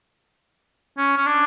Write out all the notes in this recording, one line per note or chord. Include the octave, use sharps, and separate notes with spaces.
C#4
C#4
D4